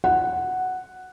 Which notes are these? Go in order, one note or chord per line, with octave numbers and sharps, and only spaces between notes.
F#5